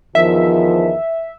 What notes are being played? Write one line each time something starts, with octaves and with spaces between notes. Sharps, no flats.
E2 D#3 F3 E5